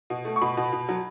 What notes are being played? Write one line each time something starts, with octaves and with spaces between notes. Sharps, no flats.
B2
A3
C#6
B2 B5
B2
B2
F#3